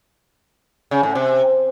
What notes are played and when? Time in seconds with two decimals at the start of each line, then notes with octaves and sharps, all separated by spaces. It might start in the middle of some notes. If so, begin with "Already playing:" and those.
0.91 C#3
1.03 A2
1.15 C3